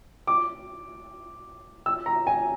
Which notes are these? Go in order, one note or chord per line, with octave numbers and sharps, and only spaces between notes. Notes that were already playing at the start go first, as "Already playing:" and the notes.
D6
E6
A#5
G#5